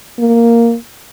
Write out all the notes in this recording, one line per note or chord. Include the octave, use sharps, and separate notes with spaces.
A#3